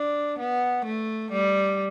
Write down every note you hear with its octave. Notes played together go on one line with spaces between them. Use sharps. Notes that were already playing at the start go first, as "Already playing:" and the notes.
Already playing: D4
B3
A3
G3